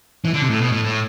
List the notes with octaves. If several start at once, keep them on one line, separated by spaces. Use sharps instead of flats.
E3
D3
C3
A2
B2
A2
A2